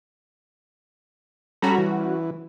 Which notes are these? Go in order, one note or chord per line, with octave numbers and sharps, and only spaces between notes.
G3 C#4 F#4 A4 A#5 B5
E3